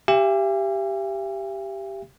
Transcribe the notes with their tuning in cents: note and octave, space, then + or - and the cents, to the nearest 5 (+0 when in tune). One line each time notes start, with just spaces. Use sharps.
G4 +0 E5 +45 G#5 -40